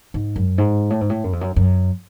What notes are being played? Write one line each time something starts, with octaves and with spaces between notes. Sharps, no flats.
G#2
F#2
G#2
A2
G#2
A2
F#2
F2
F#2
F#2